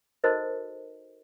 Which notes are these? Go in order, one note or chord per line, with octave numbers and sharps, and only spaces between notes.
D#4 F#4 A4 A#4 C5 D#5